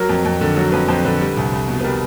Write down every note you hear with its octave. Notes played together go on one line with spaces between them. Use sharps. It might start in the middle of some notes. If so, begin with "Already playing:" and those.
Already playing: F#3 A#4
F2
F2
D3
F#3
F2 B4
F2 C5
D3 B4
G3
C2
C2
B2
B4
G3 A#4